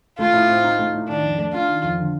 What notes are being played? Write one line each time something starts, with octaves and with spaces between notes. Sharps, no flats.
A3 F4
A2
C4
D#4
A3
A2
D#3 D4
F2
A3
D4 F4
D#3
F2
D3